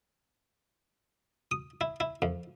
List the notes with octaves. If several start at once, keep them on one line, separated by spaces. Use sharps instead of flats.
D#6
E4
E4
F2